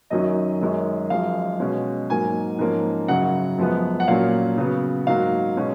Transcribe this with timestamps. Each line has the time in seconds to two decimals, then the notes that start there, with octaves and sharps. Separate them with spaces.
0.10 F#2 D#3 F#3 C#4 D#5
0.61 F#2 D#3 G#3 C#4
1.10 F#2 F3 G#3 F5
1.60 B2 G#3 C#4
2.10 G#2 F#3 A#3 G#5
2.59 G#2 F3 A#3 C#4
3.08 F#2 C#3 F#3 F#5
3.58 F#2 F3 G#3 B3
4.00 F#5
4.08 A#2 F#3 A#3 C#4 F5
4.58 C#3 F#3 B3
5.07 G#2 F#3 A#3 F5
5.57 B2 G#3 C#4